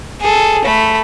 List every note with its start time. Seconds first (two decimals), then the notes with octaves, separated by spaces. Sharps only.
0.21 G#4 A4
0.65 A3 B5